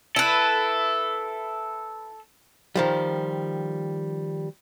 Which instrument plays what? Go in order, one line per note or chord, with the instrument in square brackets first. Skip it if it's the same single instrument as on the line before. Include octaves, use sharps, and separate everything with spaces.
[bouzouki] E4 B4 [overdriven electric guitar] A4
[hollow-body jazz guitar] D#3 F3 G3